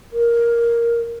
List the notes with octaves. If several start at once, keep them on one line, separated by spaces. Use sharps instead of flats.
A#4